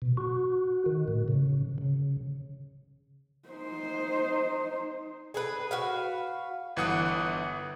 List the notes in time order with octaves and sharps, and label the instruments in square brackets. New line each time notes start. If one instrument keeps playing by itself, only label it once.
[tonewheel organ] B2
F#4
D#3
A2
C#3
C#3
[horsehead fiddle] D#4 C5
[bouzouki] G#4 A4 B4
F#4 B4 F5
[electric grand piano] G1 E3 F#5 D#6 F#6